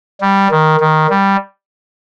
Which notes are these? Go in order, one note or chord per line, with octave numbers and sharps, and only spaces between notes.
G3
D#3
D#3
G3